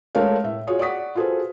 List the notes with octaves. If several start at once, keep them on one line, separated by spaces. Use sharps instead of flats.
G#3 A3 A#4 B4 C#5 F5
A2 E5
F4 F#4 G#4 C#5
D5 F#5 C#6 D#6 B6
F4 F#4 G#4 A4 B4 C5